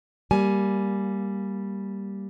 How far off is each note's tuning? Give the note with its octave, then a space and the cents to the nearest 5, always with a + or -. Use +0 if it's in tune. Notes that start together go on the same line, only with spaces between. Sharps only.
G3 +0 A#3 +0 G#5 +15